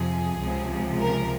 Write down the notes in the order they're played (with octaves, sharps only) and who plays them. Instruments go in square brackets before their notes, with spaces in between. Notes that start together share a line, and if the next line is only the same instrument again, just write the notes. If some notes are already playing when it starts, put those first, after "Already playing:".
Already playing: [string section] F2 C3 F3 G#4
C#2 C3 F3
A#4